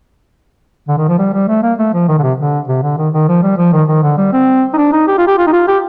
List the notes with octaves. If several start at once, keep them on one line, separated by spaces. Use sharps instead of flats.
D3
D#3
F3
G3
G3
A3
A#3
A3
F3
D#3
D3
C3
D3
C3
D3
D#3
D#3
F3
G3
F3
D#3
D#3
D3
G3
C4
D#4
D4
D#4
G4
F4
G4
F4
D#4
F4
G4